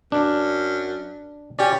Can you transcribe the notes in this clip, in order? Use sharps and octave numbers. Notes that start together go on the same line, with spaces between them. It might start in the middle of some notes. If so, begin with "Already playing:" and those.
F#2 D4
C#4 G4 D5